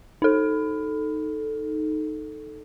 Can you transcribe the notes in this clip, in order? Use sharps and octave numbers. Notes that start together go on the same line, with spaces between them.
D#4 A4